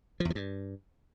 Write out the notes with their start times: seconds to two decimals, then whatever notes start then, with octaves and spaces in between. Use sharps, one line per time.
0.20 F3
0.25 E2
0.30 F3
0.35 G2